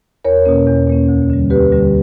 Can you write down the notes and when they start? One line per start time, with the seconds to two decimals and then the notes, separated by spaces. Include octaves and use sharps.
0.24 E2 A#4 C#5
0.46 B2 A#3 C#4
0.67 E2
0.87 B2 A#3 C#4
1.09 D2
1.30 D3 G3
1.50 D2 G4 B4
1.72 D3 G3